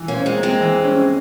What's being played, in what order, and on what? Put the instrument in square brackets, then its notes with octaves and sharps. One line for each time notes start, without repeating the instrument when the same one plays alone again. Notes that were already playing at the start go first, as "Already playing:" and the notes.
Already playing: [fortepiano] E3
[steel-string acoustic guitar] A#3 C#4
[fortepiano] C5
[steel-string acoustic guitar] G#3 C4
[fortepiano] A#3
[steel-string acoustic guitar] G#3 C4
[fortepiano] E3
C#4